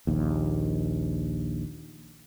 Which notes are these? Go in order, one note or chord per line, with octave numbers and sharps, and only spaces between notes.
A#1 D#2